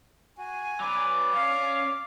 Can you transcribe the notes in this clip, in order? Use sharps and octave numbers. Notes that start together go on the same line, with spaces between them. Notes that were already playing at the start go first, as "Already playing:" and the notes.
F#4 G#5
F#3 B4 D5 D6
C#4 F5